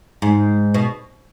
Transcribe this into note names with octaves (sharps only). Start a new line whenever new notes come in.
G#2
B2